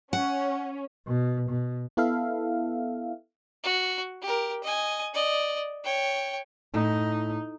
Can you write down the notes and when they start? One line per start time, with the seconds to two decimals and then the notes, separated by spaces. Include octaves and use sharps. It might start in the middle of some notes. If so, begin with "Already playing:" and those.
0.13 C#4 F#5
1.07 B2
1.49 B2
1.97 B3 E4 A4 E5 F5
3.64 F#4
4.23 G4 A#4
4.63 D#5 G#5
5.14 D5 D#5
5.84 C#5 G5
6.74 A2 D#4